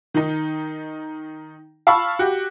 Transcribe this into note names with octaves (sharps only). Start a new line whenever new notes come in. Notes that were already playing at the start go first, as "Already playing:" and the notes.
D#3 D#4
F5 A5 B5 C#6 E6
F#4 G4